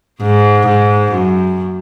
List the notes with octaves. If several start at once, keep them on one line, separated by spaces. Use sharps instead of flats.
G#2
G#2
F#2